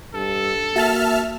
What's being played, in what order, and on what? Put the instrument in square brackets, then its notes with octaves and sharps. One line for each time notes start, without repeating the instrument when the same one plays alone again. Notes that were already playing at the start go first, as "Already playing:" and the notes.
[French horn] G2 [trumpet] A4
[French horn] A#3 [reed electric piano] F#4 A6 [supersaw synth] E5 A5 F6